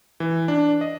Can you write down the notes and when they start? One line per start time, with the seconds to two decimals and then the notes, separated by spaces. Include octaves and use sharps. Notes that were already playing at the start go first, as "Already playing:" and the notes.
0.20 E3
0.48 D4
0.81 D#5